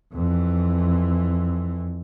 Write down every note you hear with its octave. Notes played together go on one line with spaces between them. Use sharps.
F2 E3